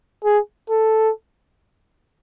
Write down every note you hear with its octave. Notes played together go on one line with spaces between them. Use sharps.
G#4
A4